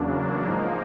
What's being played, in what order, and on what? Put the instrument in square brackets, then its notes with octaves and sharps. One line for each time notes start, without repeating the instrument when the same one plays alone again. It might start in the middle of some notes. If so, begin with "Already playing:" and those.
Already playing: [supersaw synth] E2 C#3 F#3 A#3 D4
G#2 F3 A#3 D#4